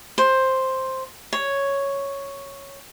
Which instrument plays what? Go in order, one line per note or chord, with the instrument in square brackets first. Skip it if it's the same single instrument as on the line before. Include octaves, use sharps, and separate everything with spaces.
[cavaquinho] C5
C#5